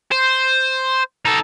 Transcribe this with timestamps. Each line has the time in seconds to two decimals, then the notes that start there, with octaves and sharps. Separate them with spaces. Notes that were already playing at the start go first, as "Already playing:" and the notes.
0.12 C5
1.25 D#4 A4